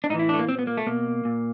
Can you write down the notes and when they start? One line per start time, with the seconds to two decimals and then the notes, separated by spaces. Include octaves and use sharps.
0.04 D4
0.10 A2 D#4
0.14 E3
0.19 E4
0.29 A3 D4
0.39 A#3
0.48 A#2 C4
0.59 B3
0.67 A#3
0.77 A3
0.87 B2 A#3
1.25 A#2